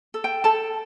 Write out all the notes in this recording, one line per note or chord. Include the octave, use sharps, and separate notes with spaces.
A4
G5
A4 A5